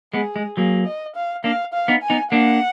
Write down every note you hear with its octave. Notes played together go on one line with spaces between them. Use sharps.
G#3 B3 G#4
G#3
F#3 A#3 G#4
D#5
F5
A#3 D4 F5
F5
B3 D#4
G#5
B3 D#4
A#3 D4 F#5